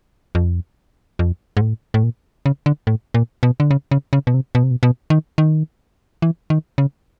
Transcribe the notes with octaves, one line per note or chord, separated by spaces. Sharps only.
F2
F2
G#2
A2
A2
A#2
C#3
D3
A2
A#2
B2
D3
C#3
C#3
C#3
B2
C3
B2
C3
B2
B2
D#3
D#3
E3
D#3
C#3